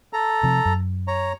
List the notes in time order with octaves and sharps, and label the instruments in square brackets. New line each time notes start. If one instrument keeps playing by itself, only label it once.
[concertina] A4 A#5
[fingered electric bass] C3 F3
F#2
[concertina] C#5 A#5